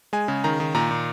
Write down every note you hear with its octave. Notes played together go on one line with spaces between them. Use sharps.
G#3 G#5
C#3
D#3 A#5
D#3
A#2 A#5
A#2